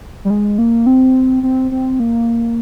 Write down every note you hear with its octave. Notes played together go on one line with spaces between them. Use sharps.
G3
G#3
A#3
C4
C4
C4
A#3